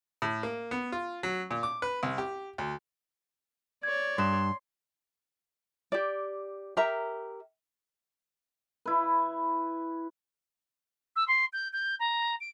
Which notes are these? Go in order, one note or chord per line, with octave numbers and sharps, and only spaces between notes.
A2
A#3
B3
F4
F#3
A#2
D6
B4
C2
G4
D2
C#5 D5 G#6
G2 C6 D#6 F#6 E7
G4 D5
G4 A#4 E5 A#5
E4 B4
E6
C6
G6
G6
A#5
D7